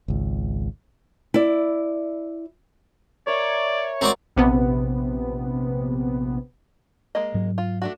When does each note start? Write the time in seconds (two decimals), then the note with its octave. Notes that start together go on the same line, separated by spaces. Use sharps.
0.08 G#1 C#2
1.34 E4 D5
3.27 A#4 C#5 D5 E5
4.01 C4 F#4 A#4 D5 B5
4.37 A#1 C3 B3
7.15 G#3 A#3 D#5
7.34 G#2 F#3
7.58 F4
7.82 A3 D4 F#4